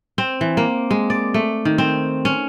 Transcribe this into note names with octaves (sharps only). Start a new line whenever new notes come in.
C4
E3
A#3
G#3
D5
A3
D#3
C4
C#4